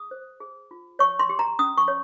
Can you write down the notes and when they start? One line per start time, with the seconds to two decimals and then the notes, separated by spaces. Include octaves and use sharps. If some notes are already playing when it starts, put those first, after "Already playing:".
Already playing: G#4 D#6
0.11 C5
0.40 G#4
0.71 F4
0.99 C#5 C#6
1.19 C6
1.29 G4
1.39 A#5
1.59 C#4 D#6
1.78 C#6
1.88 C#5